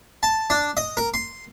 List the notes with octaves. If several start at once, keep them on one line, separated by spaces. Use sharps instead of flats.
A5
D4
D#5
A#4
C6